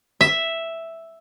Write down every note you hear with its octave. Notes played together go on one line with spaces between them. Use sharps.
E5